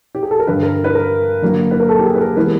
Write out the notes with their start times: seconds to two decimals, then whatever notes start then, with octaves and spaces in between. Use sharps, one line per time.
0.15 G4
0.23 G#4
0.31 A4
0.40 A#4
0.47 G2 D3 G3 B4
0.63 A#4
0.84 B4
0.95 A#4
1.42 D3 F#3 A#3
1.71 B4
1.80 A#4
1.89 A4
1.99 G4
2.06 G#4
2.15 B4
2.21 A#4
2.37 E3 G#3 B3 B4